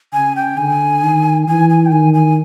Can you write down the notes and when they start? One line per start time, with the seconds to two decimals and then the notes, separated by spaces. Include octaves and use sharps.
0.13 C#3 G#5
0.36 G5
0.57 D3 G#5
1.03 D#3
1.48 E3 G#5
1.70 G#5
1.86 G5
1.92 D#3 G#5
2.14 G#5